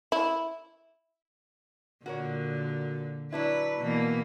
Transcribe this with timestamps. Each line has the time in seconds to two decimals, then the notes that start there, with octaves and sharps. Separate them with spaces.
0.12 E4
2.06 A#2 D3 F#4 A#4 C#5
3.32 F#3 D4 E4 B4
3.80 B2 E3 A#3